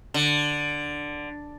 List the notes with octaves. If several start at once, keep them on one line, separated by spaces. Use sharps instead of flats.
D3